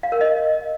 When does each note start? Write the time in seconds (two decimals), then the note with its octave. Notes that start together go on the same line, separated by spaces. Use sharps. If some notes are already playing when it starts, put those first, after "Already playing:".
0.03 F5
0.12 A#4
0.21 D#5